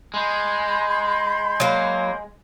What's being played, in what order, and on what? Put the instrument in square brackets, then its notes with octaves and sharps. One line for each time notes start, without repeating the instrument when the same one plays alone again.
[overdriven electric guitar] G#3 [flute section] B5 C6 G6
[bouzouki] F#3 A#3